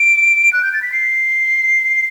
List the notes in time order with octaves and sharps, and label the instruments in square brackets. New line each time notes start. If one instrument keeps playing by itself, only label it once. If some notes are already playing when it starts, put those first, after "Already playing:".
Already playing: [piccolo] D7
F#6
G6
A6
B6
C7